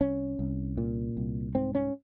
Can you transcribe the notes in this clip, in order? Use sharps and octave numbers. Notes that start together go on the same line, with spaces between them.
C2 C#4
C2
A#2
C2
G#2 C4
C#4